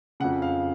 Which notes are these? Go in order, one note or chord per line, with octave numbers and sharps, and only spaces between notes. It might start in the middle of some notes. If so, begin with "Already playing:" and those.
F2 C#3 F#5
F5